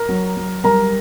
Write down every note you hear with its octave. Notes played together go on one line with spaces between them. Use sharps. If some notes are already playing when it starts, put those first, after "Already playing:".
Already playing: A#4 A#5
F#3
F#3
G3 A#4 A#5